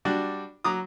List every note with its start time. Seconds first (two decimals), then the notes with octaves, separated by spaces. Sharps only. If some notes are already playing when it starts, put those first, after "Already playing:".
0.05 G3 D4 F#4 D5
0.64 F#3 A#5 D6 D#6